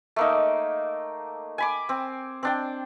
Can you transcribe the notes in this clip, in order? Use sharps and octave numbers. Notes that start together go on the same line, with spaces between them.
A3 A#3 D#4
G#5 B5 D6
C4
C4 D4 G5